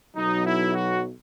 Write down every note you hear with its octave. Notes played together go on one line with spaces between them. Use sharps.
B1 B2 F#3 D#4
E4
F#4